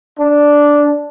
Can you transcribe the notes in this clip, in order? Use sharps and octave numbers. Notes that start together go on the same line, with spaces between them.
D4